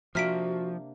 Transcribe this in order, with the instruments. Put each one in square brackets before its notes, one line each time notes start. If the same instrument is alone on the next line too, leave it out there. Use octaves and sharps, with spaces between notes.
[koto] C3 A#3 D4 [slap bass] F3 [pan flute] F#4 [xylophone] F6 B6 D7